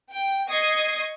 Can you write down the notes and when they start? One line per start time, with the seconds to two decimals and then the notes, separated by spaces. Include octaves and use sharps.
0.10 G5
0.50 D#5 C#6 D#6 G#6 C7